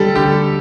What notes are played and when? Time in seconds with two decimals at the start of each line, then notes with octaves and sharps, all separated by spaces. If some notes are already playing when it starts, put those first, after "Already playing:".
Already playing: D3 G3 A4
0.15 D3 G4